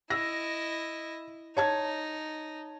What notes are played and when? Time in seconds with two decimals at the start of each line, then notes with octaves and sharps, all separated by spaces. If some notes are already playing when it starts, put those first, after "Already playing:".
0.10 E4 D#5 E6 A#6
1.57 D#4 C#5 A5 G#6